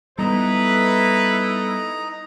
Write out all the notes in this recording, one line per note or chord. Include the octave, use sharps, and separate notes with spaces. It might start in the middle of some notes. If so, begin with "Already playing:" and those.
G3 B3 D#4 E4 A4 B4 A#5